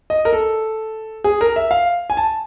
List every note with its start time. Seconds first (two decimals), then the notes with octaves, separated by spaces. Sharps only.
0.10 D#5
0.25 A#4
0.33 A4
1.24 G#4
1.41 A#4
1.56 E5
1.71 F5
2.10 G#5
2.17 A5